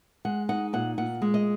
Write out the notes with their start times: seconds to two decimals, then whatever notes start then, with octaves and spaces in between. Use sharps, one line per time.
0.25 G#3 F#5
0.49 D#4 F#5
0.73 A#2 F#5
0.98 A#2 F#5
1.22 G#3
1.34 D#5